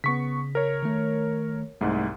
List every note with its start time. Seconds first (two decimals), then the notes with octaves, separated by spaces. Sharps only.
0.04 C#3 B3 C#6 B6
0.55 A#4 C#5
0.83 D#3 A3
1.81 C2 G#2 A3